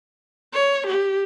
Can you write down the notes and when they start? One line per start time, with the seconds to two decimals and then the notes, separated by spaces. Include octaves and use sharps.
0.53 C#5
0.86 G4